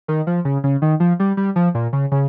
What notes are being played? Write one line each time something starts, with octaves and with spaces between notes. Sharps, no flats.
D#3
F3
C#3
C#3
D#3
F3
G3
G3
F3
A#2
C#3
C#3